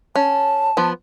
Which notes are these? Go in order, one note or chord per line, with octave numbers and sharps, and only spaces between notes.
C#4 A5
F3 B3